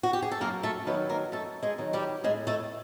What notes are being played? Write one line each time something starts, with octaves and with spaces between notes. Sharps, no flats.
F#4
G4
G#4
A4
F#2 A#3 A#4
A3 A4
D#3 F#3 B3 B4
A#3 A#4
F#2 A3 A4
G#3 G#4
D#3 F#3
G3 G4
A2 G#3 G#4
A3 A4